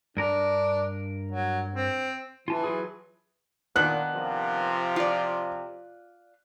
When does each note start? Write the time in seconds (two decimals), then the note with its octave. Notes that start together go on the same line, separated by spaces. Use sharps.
0.17 G2 D4 A#4 A#5
1.31 F#3
1.75 C4
2.48 E3 F4 A5
2.64 F#3 F4 G#4
3.76 A#2 D#3 B3 D4 F#6
4.14 C3 F3
4.96 F4 D5